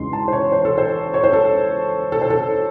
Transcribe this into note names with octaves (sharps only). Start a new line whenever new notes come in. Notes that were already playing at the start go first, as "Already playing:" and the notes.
Already playing: E2 C#3 G#3 D#4 C6
A5
C5
C#5
C5
A4
C5
C#5
C5
A4
A4
C5
A4